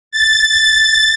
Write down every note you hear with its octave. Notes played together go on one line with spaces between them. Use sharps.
A6